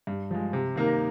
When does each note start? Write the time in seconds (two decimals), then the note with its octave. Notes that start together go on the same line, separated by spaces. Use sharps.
0.07 G2
0.31 F3 G#3
0.53 C3
0.76 D#3 A#3 D#4 A#4